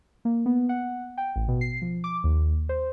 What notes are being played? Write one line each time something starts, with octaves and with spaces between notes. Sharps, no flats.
A#3
B3
F#5
G5
A1
B2
C7
F3
D6
D#2
C5